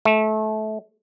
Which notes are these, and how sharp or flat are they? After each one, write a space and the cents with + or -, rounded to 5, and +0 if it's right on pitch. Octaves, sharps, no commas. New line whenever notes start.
A3 -25